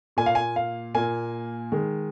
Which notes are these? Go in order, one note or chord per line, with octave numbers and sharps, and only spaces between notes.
A#2 A#3 G#5
F5
G#5
F5
A#2 A#3 G#5
D#3 G#3